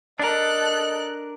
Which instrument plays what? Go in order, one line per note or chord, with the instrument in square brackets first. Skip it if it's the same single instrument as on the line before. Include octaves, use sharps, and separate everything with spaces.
[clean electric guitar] D4 A#4 [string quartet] A4 F#6 [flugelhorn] D#5